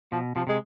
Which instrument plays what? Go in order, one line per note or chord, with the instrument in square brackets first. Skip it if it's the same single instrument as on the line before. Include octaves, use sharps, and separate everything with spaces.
[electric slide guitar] B2 [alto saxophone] F3
[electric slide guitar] C3 [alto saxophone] F3
[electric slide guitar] C3 [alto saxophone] G#3